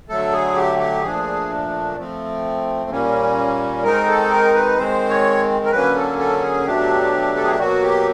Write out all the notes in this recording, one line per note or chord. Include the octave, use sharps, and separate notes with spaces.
D3 F#3 A3 A4
G#4
G4
G4
A#2 F3 A3 D4 G#4
F3 A3 C4
A#2 G3 A#3 C#4
D#3 G#3 C4 D#4 A#4
A4
A#4
B4
D#3 G#3 C4 C5
C#5
A#4
D3 F#3 A#3 C#4 B4
A4
A4
G#4
B2 F#3 A3 D4 G4
A4
G#4
G4
B2 F#3 A#3 F#4
G4